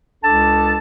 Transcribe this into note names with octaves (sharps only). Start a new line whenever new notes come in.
C#2 D4 A4 A5